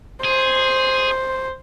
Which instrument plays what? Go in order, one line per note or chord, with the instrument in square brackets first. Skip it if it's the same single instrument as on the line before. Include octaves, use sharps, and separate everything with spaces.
[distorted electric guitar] G#4 [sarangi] C5